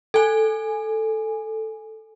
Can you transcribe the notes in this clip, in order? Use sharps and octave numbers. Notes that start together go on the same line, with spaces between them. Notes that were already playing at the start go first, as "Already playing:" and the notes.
A4 G#5